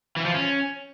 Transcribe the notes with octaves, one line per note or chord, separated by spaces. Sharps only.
E3
F3
C#4